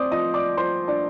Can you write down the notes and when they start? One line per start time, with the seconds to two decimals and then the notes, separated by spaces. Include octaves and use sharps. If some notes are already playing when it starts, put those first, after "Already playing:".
Already playing: C4 C5 D5 D6 D#6
0.11 F3 D#5 D#6
0.34 D5 D6
0.57 F3 C5 C6
0.88 D4 D5